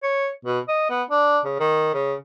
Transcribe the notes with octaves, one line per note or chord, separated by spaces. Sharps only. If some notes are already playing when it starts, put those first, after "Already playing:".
C#5
B2
D#5
B3
D4
C#3
D#3
C#3